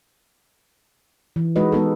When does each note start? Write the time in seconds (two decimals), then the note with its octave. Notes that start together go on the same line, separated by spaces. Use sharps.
1.36 E3
1.56 G#3 D#4 F#4 B4 D#5
1.72 G#3 B3 D#4 A4